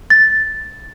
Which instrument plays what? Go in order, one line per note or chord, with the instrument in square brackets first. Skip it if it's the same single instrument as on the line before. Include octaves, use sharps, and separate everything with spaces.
[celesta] A6